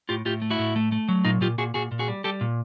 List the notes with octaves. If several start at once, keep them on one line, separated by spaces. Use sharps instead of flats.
A2 F4 G4
A2 F4 G4
A3
E4 F#4
A2
A3
A3
F#3
A#2 D#4 F4
A#2 F4 G4
A#2 F#4 G#4
A#2 F#4 G#4
A#2
F#4 G#4
G3
G3 G4 A4
A#2